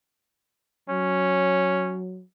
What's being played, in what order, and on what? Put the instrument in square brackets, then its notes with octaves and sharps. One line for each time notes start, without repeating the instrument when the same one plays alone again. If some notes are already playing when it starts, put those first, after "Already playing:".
[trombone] F#3 [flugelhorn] C#4